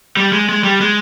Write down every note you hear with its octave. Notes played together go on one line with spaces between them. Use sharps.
G3
G#3
G#3
G3
G#3